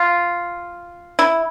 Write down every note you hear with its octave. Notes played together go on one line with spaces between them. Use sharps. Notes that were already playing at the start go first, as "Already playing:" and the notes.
Already playing: F4
E4